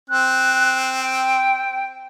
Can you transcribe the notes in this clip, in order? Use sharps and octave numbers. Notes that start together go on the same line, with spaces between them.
C4 F#6
G5